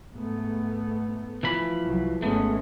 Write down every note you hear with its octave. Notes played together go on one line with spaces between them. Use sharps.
G#2 A3 B3
E3 F3 B5
C2 F#3
G#1 G#3 A3 B3 C#4